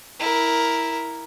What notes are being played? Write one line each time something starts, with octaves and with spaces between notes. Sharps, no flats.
E4 A#4